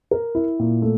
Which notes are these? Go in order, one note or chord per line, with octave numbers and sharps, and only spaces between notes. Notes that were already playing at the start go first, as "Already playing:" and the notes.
A#4
E4
A#2
A3